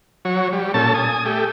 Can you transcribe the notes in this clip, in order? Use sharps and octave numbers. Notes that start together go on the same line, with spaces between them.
F#3 C#5
G3
A#2 C#4 A4 A5
G#5 D#6
A3 G4